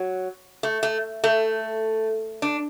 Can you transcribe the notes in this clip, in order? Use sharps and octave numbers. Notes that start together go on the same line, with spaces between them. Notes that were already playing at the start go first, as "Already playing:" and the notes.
Already playing: F#3
A3
A3
A3
D4